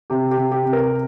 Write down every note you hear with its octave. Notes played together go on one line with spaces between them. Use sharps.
C3 G4
G4
C3
G4
C3
A#4